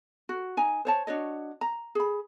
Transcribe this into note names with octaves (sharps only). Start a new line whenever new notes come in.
F#4
D#4 G#5 A#5
C5 C#5 A5
D4 F#4 C#5 D#5
A#5
G#4 B5